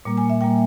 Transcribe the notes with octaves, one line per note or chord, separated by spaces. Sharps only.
A#2 G3 A#3
G#5
E5
A#2 G3 A#3 G5